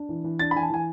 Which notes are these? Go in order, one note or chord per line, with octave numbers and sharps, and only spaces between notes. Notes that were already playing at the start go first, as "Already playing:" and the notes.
Already playing: D4
E3
E3
D4 A6
B5
E3 G#5
A5
E3 G#5